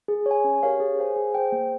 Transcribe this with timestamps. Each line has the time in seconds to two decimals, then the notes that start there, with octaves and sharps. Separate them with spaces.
0.08 G#4
0.26 C#5 G#5
0.44 C#4
0.63 G4 A#4 C#5 F5
0.80 G#4
0.99 C5 F5 G#5
1.16 G#4
1.34 C5 G5
1.52 A#3